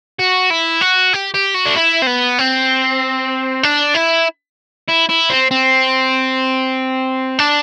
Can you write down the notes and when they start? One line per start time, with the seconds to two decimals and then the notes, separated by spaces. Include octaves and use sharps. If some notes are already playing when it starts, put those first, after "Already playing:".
0.19 F#4
0.50 E4
0.81 F#4
1.14 G4
1.34 G4
1.54 F#4
1.66 D4
1.76 E4
2.02 C4
2.07 B3
2.39 C4
3.63 D4
3.95 E4
4.89 E4
5.09 E4
5.30 C4
5.51 C4
7.39 D4